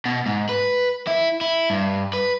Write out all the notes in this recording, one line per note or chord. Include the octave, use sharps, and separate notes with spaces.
B2
G#2
B4
E4
E4
G2
B4